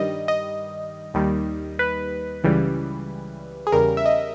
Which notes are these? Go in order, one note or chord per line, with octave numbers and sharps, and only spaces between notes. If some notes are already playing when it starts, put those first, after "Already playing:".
Already playing: G2 D#3 G3 D#5
D#5
D#2 D#3 G3
B4
C#2 C#3 E3 G3
G#4
E2 C#3 G3 A#4
E5
D#5